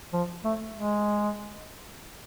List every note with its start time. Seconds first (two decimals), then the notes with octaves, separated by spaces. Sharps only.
0.13 F3
0.44 A3
0.75 G#3